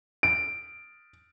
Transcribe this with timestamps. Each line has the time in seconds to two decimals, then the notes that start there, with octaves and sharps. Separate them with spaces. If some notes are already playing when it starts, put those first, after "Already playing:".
0.23 D7